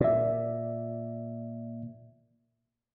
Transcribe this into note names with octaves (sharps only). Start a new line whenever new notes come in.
A#2 D5 E5